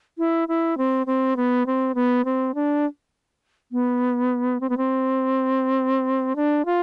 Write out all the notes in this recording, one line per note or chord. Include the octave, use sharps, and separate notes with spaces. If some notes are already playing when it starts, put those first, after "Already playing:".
E4
E4
C4
C4
B3
C4
B3
C4
D4
B3
C4
B3
C4
D4
F4